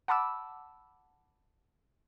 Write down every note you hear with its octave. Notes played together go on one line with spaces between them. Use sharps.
F#5 A5 B5 D6 E6